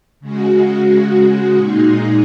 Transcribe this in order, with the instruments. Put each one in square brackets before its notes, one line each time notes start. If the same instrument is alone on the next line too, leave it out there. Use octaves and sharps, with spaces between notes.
[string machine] C#3 G#3 F#4
A#2 G#3 D#4 G#4